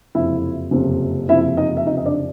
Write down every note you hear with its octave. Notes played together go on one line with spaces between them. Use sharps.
F#1 F2 C3 F3 E4 E5
F#1 F2 C3 F3
F#1 F2 C3 F3 E4 E5
D#4 D#5
E5
F#1 F2 C3 F3 D#4 D#5
D#5
D4 D5